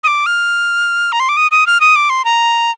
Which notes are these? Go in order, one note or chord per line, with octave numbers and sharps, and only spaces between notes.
D#6
D6
F6
A#5
C6
D6
D#6
D#6
F6
D#6
D6
C6
A#5